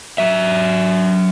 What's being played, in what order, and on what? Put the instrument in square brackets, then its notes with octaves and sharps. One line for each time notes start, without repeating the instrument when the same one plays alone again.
[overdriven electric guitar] F#3 E5